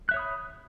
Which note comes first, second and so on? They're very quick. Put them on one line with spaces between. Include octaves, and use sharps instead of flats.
F#6 E5 C#5 D#6 B5